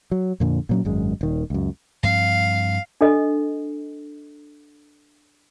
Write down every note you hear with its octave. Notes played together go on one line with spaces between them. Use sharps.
F#3
F2 A#2 D3
A#2 F#3 C#4
G#1 F#2 G#3
D#1 D#3
C#2 F#2
G2 F3 C4 F5
D4 A4 D#5